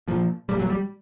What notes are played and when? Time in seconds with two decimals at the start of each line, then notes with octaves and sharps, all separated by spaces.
0.08 A#2 F3
0.49 A#2 G3
0.59 F#3
0.70 G3